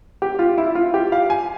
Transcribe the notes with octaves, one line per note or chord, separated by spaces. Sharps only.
G4
F4
E4
F4
G4
F5
G#5